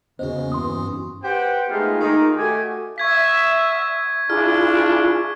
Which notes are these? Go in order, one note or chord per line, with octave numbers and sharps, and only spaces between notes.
E2 C#3 A#3 B3 C#4 F#4 C5 D#5
G2 E3 C6 D#6
G4 B4 C5 F#5 G5
G#3 A3 B3 D#4 F4 G4
D#3 A3 A#3 D#4 F4 G#4
A3 F#4 G4 D#5 G#5
E5 C#6 G#6 B6
D4 E4 F4 G#4 F6